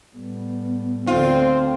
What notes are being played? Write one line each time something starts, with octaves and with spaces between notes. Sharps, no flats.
A2 G3 B3
D2 D3 C4 F4